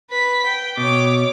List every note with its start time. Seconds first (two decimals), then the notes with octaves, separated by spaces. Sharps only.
0.10 B4 B6
0.46 G5
0.77 B2 C#5 D6